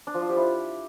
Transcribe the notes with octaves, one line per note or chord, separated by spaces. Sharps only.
D4
F3
F4
G4
E4